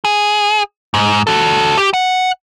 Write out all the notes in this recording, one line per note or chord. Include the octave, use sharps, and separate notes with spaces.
G#4
G#2
F#4 A4
G4
F#5